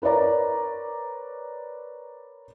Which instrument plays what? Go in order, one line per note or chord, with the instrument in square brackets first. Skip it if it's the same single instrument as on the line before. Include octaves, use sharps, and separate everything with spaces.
[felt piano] A#4 B4 C#5 D5 A#5